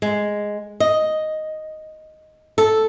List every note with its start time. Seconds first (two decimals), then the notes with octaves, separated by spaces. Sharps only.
0.02 G#3
0.80 D#5
2.58 A4